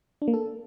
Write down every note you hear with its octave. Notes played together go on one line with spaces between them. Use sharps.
D4
A#3
A4